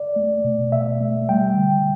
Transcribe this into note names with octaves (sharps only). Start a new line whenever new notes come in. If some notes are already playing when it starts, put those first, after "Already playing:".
Already playing: D5
A3
B2
B2 E5
A3
G3 G5
D3